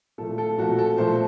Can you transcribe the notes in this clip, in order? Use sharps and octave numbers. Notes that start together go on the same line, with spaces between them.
A#2 F3 A3 A4
A4
A#2 F3 A3 F#4
A4
A#2 F3 A3 C5